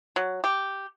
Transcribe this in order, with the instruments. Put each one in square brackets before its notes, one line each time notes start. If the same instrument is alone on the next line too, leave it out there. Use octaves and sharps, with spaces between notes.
[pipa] F#3
G4